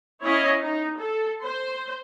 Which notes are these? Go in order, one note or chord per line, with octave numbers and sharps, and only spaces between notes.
C#4 E4 C#5 D#5 F5
D#4
A4
C5